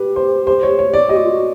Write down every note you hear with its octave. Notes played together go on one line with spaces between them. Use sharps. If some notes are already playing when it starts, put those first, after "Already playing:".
Already playing: G4 B4
C5
C5
C#5
C#5
D5
G4 D#5
F#4
F4
F#4